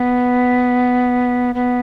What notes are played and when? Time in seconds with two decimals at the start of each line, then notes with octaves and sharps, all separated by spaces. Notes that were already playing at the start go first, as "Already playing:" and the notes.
Already playing: B3
1.55 B3